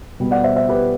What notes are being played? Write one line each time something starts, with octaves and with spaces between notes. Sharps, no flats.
B2 G3 B3
D5 F#5
C5 E5
C5 E5
G4 B4